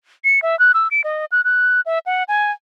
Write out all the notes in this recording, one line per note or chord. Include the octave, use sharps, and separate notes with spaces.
C#7
E5
F#6
E6
D7
D#5
F#6
F#6
E5
F#5
G#5